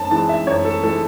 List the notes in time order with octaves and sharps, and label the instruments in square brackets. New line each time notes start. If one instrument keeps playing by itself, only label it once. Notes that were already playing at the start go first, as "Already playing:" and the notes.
Already playing: [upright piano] F#2 A5
E3 G#3 A5
E5
F#2 C#5
A4
E3 G#3 A4